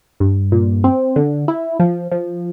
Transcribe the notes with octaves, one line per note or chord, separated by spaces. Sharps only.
G2
A#2
C4
D3
E4
F3
F3